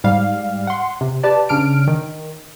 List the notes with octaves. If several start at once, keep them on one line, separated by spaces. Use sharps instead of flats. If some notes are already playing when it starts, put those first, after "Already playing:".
G#2 G3 F5
F#5 C6
C3
G4 B4 D5 A5
C#3 D4 F6 D7
D#3